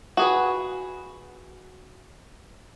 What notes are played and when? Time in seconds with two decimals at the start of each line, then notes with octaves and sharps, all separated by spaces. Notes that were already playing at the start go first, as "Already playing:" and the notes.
0.17 F#4 G#4 B4